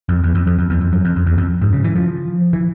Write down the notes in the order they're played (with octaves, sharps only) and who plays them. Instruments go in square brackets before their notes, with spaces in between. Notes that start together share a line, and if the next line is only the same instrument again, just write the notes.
[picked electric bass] F2
E2
F2
F2
F2
E2
F2
F#2
F2
F2
E2
F2
G#2
C#3
E3
F3
E3